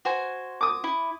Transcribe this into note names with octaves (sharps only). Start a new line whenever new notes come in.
F#4 C5 G#5
D6 D#6
E4